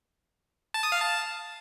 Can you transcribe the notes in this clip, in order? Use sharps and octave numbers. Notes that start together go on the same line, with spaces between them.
A5
D#6
F5
A5